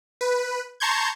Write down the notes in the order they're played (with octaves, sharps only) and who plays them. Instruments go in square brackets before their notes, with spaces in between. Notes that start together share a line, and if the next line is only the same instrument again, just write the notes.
[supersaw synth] B4
A5 A#5 C6 C#6 G6 G#6